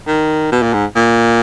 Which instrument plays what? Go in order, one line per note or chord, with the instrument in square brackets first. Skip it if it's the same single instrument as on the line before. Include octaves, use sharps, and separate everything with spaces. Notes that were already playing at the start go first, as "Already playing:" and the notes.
[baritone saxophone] D#3
B2
A#2
G#2
A#2